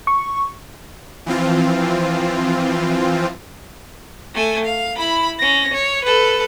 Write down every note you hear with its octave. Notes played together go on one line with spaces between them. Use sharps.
C#6
E3 F3 C4 F4
A3 G#5
F5
E4 B5
C#4 A#6
C#5
A4 B4